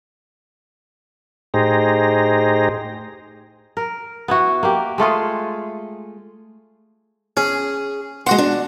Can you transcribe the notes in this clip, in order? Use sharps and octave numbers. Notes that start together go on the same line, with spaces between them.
A2 D#4 G4 G#4 C5 A#5
A#4
B3 E4 F#4
A#3 G4
G#3 A3 F4 G#4
C#4 G#4
G#3 F#4 F#5 C6
D4